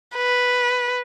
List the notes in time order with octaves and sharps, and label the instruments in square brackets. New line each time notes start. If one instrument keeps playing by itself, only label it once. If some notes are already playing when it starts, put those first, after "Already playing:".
[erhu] B4